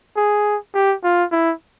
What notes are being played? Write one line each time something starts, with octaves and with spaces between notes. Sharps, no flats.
G#4
G4
F4
E4